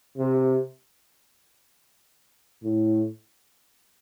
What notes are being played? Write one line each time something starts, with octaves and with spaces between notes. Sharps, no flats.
C3
A2